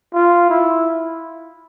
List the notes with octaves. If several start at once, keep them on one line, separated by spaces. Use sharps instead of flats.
F4
E4